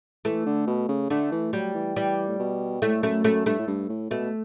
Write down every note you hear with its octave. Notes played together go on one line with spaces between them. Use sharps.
E3 A3
D3
B2
C#3
D3 A3
E3
F#3 G3
E3
E3 G3
A2
B2
A2 A3
F#2 A3
F#2 A3
G2 A3
A2
G2
A2
B2 A3